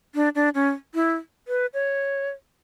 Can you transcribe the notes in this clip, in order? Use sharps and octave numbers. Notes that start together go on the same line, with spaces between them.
D4
D4
C#4
E4
B4
C#5